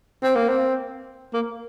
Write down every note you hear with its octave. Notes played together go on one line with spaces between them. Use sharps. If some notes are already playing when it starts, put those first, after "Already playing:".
C4
A#3
C4
A#3